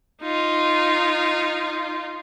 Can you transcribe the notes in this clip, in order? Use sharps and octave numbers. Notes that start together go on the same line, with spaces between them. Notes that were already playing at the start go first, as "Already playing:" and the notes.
D#4 F4